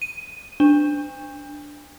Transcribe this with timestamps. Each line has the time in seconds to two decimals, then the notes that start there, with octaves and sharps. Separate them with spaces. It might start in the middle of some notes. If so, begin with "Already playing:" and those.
0.02 D#7
0.60 D4